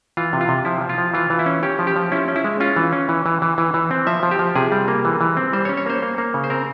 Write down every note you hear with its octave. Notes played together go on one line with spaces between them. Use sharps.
E3 F4
C3
F4
C3
F3 E4
F3
F4
F3
E3 F4
E3
E4
C#4
C#4 G4
F3
G4
F3
C#4 E4
C#4
E4
G#3
C#4 F4
E3
C#4
E3
E3
E3
E3
E3
C4
F3 E5
F3
G4
F3
C3 G#4
G3
A#3
E3
E3
C4
G3 C5
C#5
C#4
C#5
A#3 C5
A#3
A#3
C#3
C5
C4 A#4